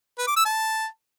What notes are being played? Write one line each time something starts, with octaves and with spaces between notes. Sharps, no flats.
B4
D6
E6
A5